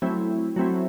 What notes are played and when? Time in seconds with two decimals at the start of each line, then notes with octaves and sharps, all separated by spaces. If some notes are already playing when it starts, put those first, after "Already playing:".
0.02 F#3 A3 C4 E4
0.56 F#3 A3 C4 E4